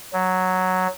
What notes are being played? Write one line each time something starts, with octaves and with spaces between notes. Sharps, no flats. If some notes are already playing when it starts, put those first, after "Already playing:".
F#3